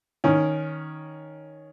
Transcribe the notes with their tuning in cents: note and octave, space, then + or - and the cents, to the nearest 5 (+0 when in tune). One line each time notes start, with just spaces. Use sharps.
D#3 +0 C#4 +0